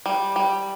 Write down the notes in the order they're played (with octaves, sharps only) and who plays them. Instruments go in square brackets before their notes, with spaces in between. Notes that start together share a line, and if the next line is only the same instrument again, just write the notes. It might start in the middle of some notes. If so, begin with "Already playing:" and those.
[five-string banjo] G3
G3